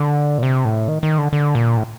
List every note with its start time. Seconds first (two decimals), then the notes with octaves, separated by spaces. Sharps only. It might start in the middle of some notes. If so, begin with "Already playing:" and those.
Already playing: D3
0.38 A#2
0.43 C3
0.65 A2
0.88 D#3
1.03 D#3
1.18 D3
1.33 D3
1.55 A#2
1.77 A2